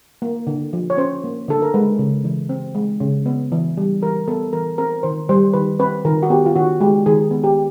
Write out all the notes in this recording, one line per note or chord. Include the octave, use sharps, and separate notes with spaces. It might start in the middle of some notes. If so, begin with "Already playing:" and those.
A#3
D3
F3
C#5
C#4 C5
A#3
D3 A4
A#4
G#3 B4
C#3
E3
C4
G#3
C#3
B3
E3
G3
E3 A#4
B3 A4
E3 A#4
C4 A#4
D#3 C5
G3 C5
D#3 B4
C4 B4
D#3 A#4
F#4
B3 G4
F4
D#3 F#4
G#3 G4
D#3 G#4
B3
G4